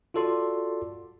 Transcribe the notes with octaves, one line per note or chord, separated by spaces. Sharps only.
F4 F#4 A4 D5 C6